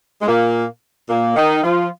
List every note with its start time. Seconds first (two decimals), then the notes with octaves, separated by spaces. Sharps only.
0.22 G#3
0.27 A#2 A#3
1.09 A#2 A#3
1.36 D#3 D#4
1.63 F3 F4